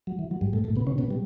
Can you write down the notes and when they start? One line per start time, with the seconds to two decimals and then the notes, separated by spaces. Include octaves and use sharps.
0.07 F#3
0.19 E3
0.31 F#3
0.41 G2 G3
0.53 A2 A3
0.64 A2 A3
0.76 B2 B3
0.87 C#3 C#4
0.98 B2 B3
1.11 G3